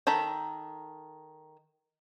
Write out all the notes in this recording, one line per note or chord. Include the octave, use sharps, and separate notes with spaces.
D#3 A4 A#5 B5